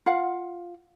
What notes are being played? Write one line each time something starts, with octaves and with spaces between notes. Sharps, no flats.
F4 F5 F#5